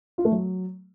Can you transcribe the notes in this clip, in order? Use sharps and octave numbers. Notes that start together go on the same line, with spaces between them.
F4
A3
F#3